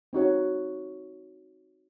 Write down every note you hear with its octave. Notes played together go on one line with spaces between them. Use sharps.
C4 D#4 F#4 C#5